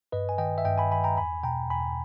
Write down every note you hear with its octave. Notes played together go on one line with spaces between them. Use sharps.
G2 B4 D#5
G#5
D#3 D#5 G5
E5
G2 D#5 G5
G#5 B5
D#3 G#5 B5
G5 A#5
E2 G#5 B5
B2 G5 A#5
E2 G#5 B5